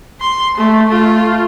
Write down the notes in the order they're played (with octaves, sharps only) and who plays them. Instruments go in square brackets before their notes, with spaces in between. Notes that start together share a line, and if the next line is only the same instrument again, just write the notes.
[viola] C6
A3
A3 F4